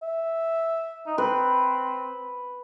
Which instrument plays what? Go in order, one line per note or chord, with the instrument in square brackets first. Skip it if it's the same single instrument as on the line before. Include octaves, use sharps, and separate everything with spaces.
[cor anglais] E5
D#4
[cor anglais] C4 [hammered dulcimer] B4